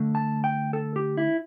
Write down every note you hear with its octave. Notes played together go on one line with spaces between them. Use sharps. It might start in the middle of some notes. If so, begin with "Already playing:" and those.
Already playing: D3 A3
A5
G5
A4
G4
E4